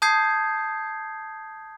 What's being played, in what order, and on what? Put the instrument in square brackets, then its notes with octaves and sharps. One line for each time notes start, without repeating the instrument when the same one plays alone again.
[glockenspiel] A5 D#6 G6 G#6 C7